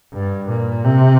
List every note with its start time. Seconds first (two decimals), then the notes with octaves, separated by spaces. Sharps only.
0.13 G2
0.49 A#2
0.85 C3